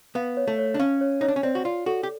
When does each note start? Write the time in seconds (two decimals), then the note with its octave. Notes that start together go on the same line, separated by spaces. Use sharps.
0.15 B3 F5
0.37 C#5
0.48 A3
0.59 C#5
0.74 D4
0.79 C#4 F5
1.01 C#5
1.21 D#4 C#5
1.28 D4
1.36 C#4
1.43 C4 D5
1.55 F#4
1.65 F4 D5
1.86 F#4 A4
2.03 G4